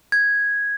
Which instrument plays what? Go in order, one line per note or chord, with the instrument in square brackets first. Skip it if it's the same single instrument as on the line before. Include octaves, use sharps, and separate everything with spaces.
[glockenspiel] G#6